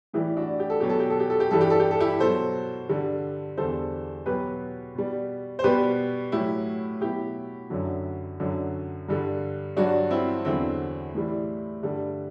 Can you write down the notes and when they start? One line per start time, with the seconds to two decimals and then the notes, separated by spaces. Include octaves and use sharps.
0.13 A2 E3 G3 E4 G4
0.37 D4 F#4
0.60 G4
0.70 A4
0.80 B2 F#3 G4
0.90 A4
1.00 G4
1.10 A4
1.20 G4
1.30 A4
1.40 G4
1.51 G2 E3 G3 A4
1.61 G4
1.70 A4
1.80 G4
1.91 A4
2.00 E4 G4
2.20 B2 F#3 A4 C5
2.89 G2 D3 G3
3.57 E2 D3 G3 A4 C5
4.26 B2 F#3 G4 B4
4.95 B2 G3
5.59 C5
5.64 B2 G3 G4 B4
6.32 A2 F#3 E4 G4
7.01 B2 F#3 E4 G4
7.70 F#2 D3 F#3
8.40 F#2 D3 F#3
9.08 G2 D3 G3
9.77 G2 F#3 D4 F#4
10.10 C4 E4
10.45 E2 D3 F#3 C4 E4
11.15 A2 E3 G3
11.83 G2 D3 G3